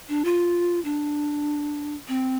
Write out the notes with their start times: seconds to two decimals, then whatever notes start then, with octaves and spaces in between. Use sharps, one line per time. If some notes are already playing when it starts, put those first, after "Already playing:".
0.09 D4
0.25 F4
0.85 D4
2.08 C4